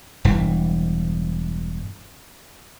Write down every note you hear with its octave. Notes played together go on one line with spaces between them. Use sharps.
E1 G2 E3